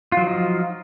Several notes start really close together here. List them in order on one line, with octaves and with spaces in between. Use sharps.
F4 F#3 F3 D#4